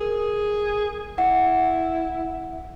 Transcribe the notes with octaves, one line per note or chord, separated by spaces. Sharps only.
G#4 A#4
E4 F#5